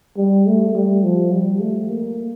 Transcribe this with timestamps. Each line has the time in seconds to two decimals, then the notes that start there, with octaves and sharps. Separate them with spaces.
0.17 G3
0.47 A3
0.75 G3
1.04 F3
1.32 G3
1.60 A3
1.89 A#3